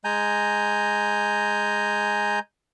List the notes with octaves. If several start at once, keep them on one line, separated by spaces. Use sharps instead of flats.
G#3 G#5 A#5 G6